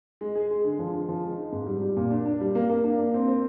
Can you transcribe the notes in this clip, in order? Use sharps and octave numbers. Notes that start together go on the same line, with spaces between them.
G#3
G#4
G#3
D3
F3
G#3
F3
G#3
D#4
G#2
G3
G3
A#2
D4
D4
G3
A#3
A#3
D4
A#3
C4
C4